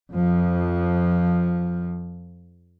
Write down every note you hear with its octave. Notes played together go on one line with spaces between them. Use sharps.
F2 F3